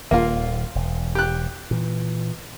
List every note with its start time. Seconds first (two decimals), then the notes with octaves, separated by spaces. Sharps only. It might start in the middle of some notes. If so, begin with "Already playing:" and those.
0.11 D#1 D#3 A#3 F4
0.75 E1
1.15 G4 F#6
1.71 A#2 E3